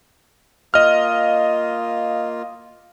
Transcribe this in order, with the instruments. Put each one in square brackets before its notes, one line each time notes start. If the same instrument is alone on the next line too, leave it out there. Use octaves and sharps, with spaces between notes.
[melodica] A#3 F4 [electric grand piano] D#5 F6